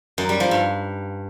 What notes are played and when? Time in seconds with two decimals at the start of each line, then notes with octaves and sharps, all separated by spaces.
0.18 F#2
0.29 G3
0.40 F3
0.51 G2